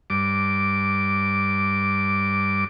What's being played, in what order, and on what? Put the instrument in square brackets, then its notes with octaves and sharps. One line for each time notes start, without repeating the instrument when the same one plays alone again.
[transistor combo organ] G2 D6